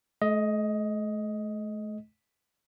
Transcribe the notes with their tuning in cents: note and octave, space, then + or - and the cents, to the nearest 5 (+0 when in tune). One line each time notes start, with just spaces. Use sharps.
A3 -40 D#5 +10